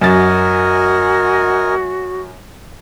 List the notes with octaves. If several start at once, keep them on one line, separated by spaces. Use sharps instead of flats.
F#2 F#4 A#4 D#5 G#5 A6